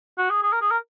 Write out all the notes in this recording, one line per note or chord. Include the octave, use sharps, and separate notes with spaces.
F#4
G#4
G#4
A#4
G#4
A#4